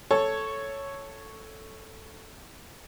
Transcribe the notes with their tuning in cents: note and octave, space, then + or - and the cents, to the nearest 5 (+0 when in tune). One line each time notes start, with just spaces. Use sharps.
A4 +0 C#5 +0